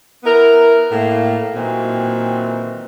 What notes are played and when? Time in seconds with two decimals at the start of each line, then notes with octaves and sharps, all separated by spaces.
0.24 B3 E4 A#4
0.92 A2 A#3
1.55 A#2 D#3 E3 F#3 C4